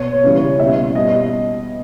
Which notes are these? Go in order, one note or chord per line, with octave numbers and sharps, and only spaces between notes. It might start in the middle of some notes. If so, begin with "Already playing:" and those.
Already playing: B2 C#5
C#3 E3 G3
B2 G3 E5
B2 G3 D#5